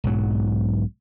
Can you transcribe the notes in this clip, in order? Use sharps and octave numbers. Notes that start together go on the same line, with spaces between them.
B1 G#2 F#3